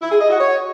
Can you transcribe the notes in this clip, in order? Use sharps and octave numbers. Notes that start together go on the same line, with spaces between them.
E4
G#4
D#5
F#4
C#5